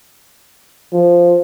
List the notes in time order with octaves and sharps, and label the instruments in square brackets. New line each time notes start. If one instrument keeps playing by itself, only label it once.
[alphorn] F3